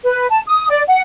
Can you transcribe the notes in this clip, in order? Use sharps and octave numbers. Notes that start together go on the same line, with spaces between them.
B4
A5
D#6
D5
F#5